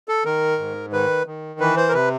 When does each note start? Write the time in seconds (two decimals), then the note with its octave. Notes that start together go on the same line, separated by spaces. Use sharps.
0.08 A4
0.25 D#3 A#4
0.58 G#2
0.93 D#3 B4
1.26 D#3
1.60 E3 B4
1.77 C5
1.89 A#4
1.94 C3 B4